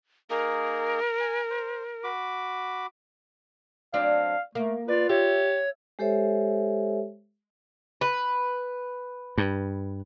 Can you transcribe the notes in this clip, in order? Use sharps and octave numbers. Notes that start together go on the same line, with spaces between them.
A#3 D#4 G#4 A#4
G#5
C5
F#4 B5 D6
F#3 C4 D4 F5
A3 A#3
F4 B4 D5
G4 C#5 E5
G#3 G4 A4 C5 C#5 E5
B4
G2